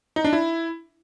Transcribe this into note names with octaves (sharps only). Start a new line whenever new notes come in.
D#4
D4
E4